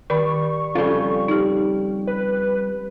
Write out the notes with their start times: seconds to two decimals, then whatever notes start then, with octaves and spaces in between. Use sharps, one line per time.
0.10 D#3 G3 D5 B5 C#6
0.75 F2 C#3 G3 F4
1.28 D#4 G4
2.07 B4